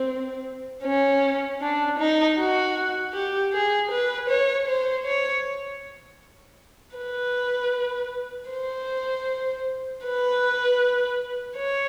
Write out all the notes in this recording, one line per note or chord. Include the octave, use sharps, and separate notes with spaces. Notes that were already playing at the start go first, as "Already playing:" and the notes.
Already playing: C4
C#4
D4
D#4
F#4
G4
G#4
B4
C#5
C5
C#5
B4
C5
B4
C#5